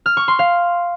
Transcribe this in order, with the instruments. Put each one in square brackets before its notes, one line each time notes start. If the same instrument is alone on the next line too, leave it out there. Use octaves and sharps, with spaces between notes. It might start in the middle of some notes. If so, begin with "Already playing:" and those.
[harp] F6
C#6
C6
F5